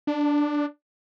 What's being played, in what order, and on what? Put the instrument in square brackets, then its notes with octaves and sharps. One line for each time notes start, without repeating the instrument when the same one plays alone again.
[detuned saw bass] D4